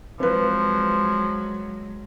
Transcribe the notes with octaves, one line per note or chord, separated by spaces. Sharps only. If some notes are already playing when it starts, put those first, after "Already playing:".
F3 F#3 G#3 C4 B4